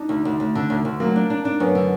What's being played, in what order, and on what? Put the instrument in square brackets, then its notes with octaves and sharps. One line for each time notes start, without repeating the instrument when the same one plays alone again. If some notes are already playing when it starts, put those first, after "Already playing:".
Already playing: [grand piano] D4 D#4
[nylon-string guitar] D2
D2
D2
D3
D2
D2
[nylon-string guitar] F#3 [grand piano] A#3
[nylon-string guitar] D4
D4
D4
[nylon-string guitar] F#2 [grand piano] B3
[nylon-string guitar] D3